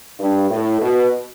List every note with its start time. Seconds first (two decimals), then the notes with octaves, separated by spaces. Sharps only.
0.19 G2
0.50 A2
0.80 B2